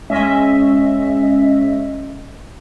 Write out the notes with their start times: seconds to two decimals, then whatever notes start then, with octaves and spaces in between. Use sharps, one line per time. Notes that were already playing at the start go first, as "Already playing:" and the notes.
0.10 G#3 C#4 D#5 E5